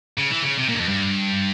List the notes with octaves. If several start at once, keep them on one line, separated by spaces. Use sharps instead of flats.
C#3
E3
C#3
C3
A#2
G2
F2
G2